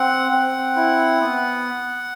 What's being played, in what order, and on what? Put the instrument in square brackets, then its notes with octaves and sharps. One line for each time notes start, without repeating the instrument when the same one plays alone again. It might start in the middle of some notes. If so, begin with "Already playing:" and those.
Already playing: [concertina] C4 F#5
C4 F#5
E4
B3